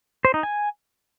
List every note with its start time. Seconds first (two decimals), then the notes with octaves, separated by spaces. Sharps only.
0.25 C5
0.34 D#4
0.43 G#5